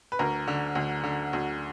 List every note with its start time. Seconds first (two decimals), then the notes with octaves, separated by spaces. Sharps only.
0.12 B4
0.19 D2 A#4
0.48 D3
0.75 D2
1.04 D3
1.33 D2